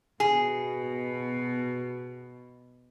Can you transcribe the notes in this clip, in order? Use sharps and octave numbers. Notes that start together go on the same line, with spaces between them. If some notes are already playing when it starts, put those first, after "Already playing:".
B2 G#4